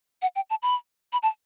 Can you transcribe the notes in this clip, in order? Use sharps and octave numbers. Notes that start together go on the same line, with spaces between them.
F#5
G5
A5
B5
B5
A5